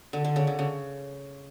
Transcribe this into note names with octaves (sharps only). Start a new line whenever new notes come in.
D3
D3
C#3
D3
C#3